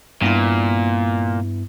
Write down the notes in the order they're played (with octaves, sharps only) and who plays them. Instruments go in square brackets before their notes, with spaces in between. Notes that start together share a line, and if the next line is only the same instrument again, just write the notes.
[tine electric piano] G2 B3 E4 [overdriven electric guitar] A#2